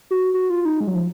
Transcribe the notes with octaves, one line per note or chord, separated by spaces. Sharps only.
F#4
F#4
F4
D#4
G#3
F#3
F3